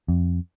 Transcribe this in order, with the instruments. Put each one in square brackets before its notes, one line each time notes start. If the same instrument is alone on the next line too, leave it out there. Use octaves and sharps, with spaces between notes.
[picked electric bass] F2